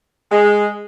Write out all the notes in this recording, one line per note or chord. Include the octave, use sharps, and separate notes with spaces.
G#3